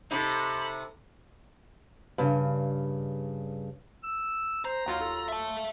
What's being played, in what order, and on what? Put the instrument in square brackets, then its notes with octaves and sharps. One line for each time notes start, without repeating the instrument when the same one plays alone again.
[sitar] C3 D#4 [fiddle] A4 B5
[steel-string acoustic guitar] G2 C#3
[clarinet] E6
[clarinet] C5 [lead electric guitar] A#5
[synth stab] D#2 F#3 F4 [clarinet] D#4
[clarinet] A4
[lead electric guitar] E5 A5